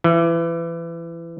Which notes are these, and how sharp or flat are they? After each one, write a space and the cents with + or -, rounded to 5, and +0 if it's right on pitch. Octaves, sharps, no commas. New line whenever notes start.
E3 +25